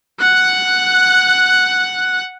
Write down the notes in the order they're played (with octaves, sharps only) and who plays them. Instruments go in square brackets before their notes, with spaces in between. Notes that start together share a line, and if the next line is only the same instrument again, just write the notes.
[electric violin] F#5 F#6